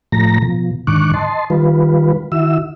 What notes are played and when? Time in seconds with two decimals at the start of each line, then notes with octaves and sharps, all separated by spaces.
0.12 A2 F3 A3 A#5 A#6
0.42 B2 F3
0.87 G#2 D3 D#3 C#6 D6 F#6
1.14 D#5 A5 C6
1.50 D#3 G3 F4 B4
2.32 D#3 E4 F#4 E5 E6